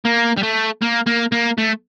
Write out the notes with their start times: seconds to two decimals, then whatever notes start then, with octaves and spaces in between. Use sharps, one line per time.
0.05 A#3
0.37 G3
0.43 A3
0.82 A#3
1.06 A#3
1.32 A#3
1.58 A3